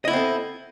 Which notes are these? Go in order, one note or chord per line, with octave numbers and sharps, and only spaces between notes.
B3 C4 E4 A4 D#5